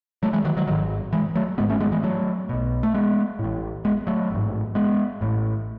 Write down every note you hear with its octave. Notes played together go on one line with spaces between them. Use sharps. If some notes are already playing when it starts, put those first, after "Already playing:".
F#3 A3
E3 G#3
D#3 F#3
D#3 F#3
G#1 G#2 D#3 F#3
E3 G#3
F#3 A3
G#1 G#2 G#3 B3
A3 C#4
G#3 B3
E3 G#3
F#3 A3
B1 B2
A3
G#3 B3
A2
A1
G#3 B3
F#3 A3
A1 G#2
G#3 B3
A1 A2